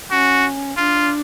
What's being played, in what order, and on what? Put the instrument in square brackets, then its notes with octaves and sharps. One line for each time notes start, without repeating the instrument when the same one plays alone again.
[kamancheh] C#4 [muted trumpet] F#4
[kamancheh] D4 [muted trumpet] F4